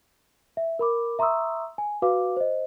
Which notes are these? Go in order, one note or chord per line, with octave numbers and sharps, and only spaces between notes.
E5
A#4 B5 D6
E5 A#5 C6 C#6 D#6 E6
G#5
F#4 B4 F5 D6
C5 D#5